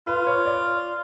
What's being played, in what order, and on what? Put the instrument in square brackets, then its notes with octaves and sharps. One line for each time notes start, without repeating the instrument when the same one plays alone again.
[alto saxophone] F4 [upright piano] B4
[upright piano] C#5
D5